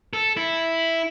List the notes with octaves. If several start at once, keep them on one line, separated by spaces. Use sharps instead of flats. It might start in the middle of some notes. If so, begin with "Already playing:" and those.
A4
E4